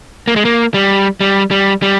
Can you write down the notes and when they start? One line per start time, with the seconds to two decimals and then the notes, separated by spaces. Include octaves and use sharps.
0.28 A#3
0.36 G#3
0.45 A#3
0.74 G3
1.20 G3
1.51 G3
1.82 G3